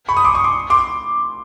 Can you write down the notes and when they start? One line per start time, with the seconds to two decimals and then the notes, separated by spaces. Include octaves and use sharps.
0.09 B5 C#6
0.17 D#6
0.25 C6 D6
0.35 C#6 D#6
0.44 C6 D6
0.70 C6 D6